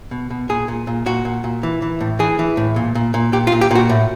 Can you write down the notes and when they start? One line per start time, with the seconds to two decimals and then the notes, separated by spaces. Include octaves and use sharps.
0.11 B2
0.30 B2
0.49 A#2 G#4
0.68 A#2
0.87 A#2
1.06 A#2 F#4
1.25 A#2
1.44 A#2
1.63 E3
1.82 E3
2.01 A2
2.19 E3 G#4
2.39 E3
2.57 A2
2.76 A#2
2.95 A#2
3.14 A#2
3.33 A#2 G4
3.47 F4
3.52 A#2
3.61 G4
3.71 A#2 F#4
3.89 A2